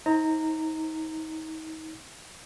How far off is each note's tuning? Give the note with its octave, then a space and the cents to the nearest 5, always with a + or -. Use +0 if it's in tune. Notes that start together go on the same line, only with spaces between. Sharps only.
D#4 +35 C5 +35 A#5 -15